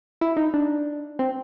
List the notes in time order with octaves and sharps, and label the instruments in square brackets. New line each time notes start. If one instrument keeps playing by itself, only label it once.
[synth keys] E4
D#4
D4
C4